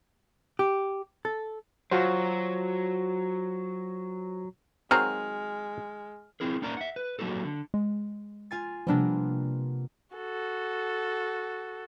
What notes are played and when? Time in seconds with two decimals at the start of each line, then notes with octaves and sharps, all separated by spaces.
0.59 G4
1.25 A4
1.91 F#3 F4 F#4 C5
4.91 D#3 F#3 G#3 C4 F#4 G#4 A#5 F6
6.40 C4 E4 G#4 A#4
6.62 A#3 C#4 D#4 A#4 D5 A#5
6.77 E5 F#5
6.96 B4
7.19 F#3 A#3 D#4 F#4 A4
7.45 D3
7.74 G#3
8.51 F4 G#5 A6
8.87 C3 F3 G3 A#3 B3 D4
10.16 F#4 A4